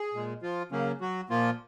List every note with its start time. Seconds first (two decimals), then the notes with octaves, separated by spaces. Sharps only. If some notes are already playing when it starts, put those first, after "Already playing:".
Already playing: G#4
0.14 A#2 G#3
0.42 F3 F4
0.71 C#3 F#3 A#3 C#4
1.01 F#3 F#4
1.29 A#2 F3 A#3 F4